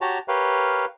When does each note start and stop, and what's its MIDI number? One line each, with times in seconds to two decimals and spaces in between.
0.01 0.19 66
0.01 0.19 67
0.01 0.19 73
0.01 0.19 81
0.01 0.19 82
0.28 0.85 67
0.28 0.85 70
0.28 0.85 71
0.28 0.85 73
0.28 0.85 77